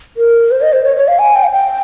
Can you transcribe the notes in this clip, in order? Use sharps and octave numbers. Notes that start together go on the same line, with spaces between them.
A#4
C5
D#5
C5
C#5
C#5
F5
G#5
G5
F5
G5